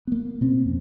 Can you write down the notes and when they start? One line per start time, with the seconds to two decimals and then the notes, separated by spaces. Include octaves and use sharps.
0.07 A#3 B3
0.41 B2 C4 C#4
0.66 F2